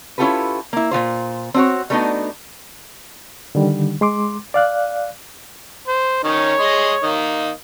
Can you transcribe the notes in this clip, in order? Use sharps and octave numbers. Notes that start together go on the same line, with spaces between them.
C#4 E4 F4 G4 A4 B4
A#3 E4
A#2 E3 F4 C5
C4 D4 F4 F#4 C#5
G3 A3 B3 D4 D#4 F#4
D3 D#3 G3
G#3 C6 D6
D5 F5 F#6
C5
D#3 C#4 D#4 C#5
G#3 D#5 C6
D#3 A#3 D#5